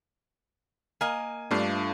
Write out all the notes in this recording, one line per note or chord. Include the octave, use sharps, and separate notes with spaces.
A#3 D#5 G#5
G2 A3 D4 F4